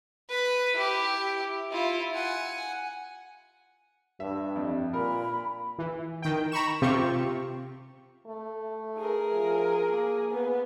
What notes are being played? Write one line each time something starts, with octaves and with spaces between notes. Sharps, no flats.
B4 B5
E4 G4
E4 F4
F#5 G#5
G2 E5
F2
A#2 A#4 B5
E3
D#3 G5
A#5 B5 C#6 E7
C3 C4 F4 G4 C#6
A3
G#4 A#4
F3
A#3
B3